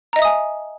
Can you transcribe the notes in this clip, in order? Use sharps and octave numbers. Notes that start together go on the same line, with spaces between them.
D#5 E5 G#5 A#5 D#6